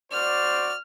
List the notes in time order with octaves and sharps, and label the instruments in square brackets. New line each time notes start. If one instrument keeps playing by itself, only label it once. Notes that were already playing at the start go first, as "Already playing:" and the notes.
[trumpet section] F#4 C5 D5 [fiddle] F6